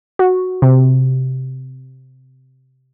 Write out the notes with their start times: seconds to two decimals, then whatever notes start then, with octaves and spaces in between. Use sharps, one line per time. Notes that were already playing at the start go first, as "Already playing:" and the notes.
0.19 F#4
0.62 C3